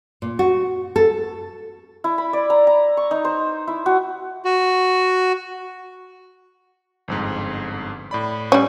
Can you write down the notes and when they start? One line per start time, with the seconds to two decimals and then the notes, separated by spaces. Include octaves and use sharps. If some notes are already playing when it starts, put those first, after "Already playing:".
0.22 A#2
0.39 F#4
0.96 A4
2.04 E4
2.18 B5
2.33 D5
2.50 A#5
2.67 A#5
2.97 C#6
3.11 D#4
3.25 C5
3.68 E4
3.86 F#4
4.45 F#4
7.08 G1 F2 G#2
8.11 A2 D5 B5
8.52 G3 C#4